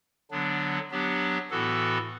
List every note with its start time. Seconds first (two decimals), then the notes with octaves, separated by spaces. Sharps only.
0.31 D3 F#3 B3 D4
0.91 F#3 B3 D4 G4
1.51 A2 E3 B3 F#4 A4